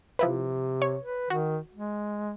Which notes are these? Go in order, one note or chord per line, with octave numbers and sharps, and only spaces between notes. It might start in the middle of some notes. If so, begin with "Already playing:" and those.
C3 F3 E4 B4
C#5
B4
D#3 F#4
G#3